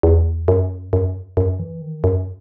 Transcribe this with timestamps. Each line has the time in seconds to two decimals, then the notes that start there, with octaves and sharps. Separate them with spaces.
0.03 E2
0.48 F#2
0.93 F#2
1.37 F#2
1.59 E3
1.81 D#3
2.04 F#2